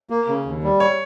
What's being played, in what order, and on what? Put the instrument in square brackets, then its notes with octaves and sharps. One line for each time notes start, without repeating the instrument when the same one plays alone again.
[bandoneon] A#3
C#3
D#2
G3
[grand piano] C#5